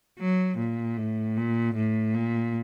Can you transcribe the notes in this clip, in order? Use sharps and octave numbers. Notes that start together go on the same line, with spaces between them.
F#3
A#2
A2
A#2
A2
A#2